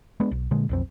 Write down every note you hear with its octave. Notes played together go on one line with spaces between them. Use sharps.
G#3 B3 D4
B1
A#2 D3 G#3
B1 F2 C4